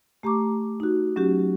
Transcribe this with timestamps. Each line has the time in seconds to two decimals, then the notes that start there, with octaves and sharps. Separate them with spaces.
0.23 A3 G4 A#5 C#6 D6
0.80 D#4 F#4
1.16 F#3 C#4 F#4 G4